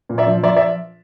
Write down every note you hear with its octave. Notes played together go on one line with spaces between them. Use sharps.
A#2
D5 E5
F3
F3 D5 E5
D5 E5